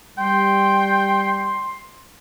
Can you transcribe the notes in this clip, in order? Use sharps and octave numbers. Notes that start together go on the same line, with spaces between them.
G3 G5 C6